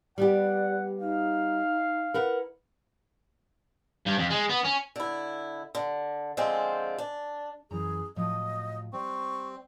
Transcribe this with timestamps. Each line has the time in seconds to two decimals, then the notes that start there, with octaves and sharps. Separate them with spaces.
0.18 G3 B3 G4 D5 F#5
0.99 D#4 F5
2.14 E4 A#4 B4 F#5
4.06 G2
4.18 F2
4.30 G#3
4.49 B3
4.64 C#4
4.96 D3 E4
5.75 D3
6.37 D3 F3 G#3 C4
6.98 D4
7.71 F#2 E3 G#4 A#5
8.16 A2 F3 F#3 D#5
8.93 G3 C4 C#6